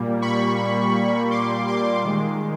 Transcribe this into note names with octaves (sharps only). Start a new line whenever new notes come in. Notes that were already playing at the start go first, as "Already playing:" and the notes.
Already playing: A#2 G3 A#3
B5 C#6
C6 D6
C6 D6
D#3 G#3